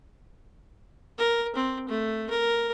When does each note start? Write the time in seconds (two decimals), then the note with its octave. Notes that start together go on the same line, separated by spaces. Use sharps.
1.18 A#4
1.55 C4
1.89 A3
2.30 A#4